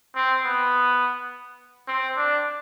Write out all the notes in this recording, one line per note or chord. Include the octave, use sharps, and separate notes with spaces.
C4
B3
C4
D4